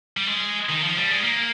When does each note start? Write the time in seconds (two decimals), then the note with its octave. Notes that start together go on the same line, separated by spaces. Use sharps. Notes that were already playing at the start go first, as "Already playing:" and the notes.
0.17 G3
0.27 G#3
0.69 D#3
0.83 F3
0.97 G3
1.11 G#3
1.24 A#3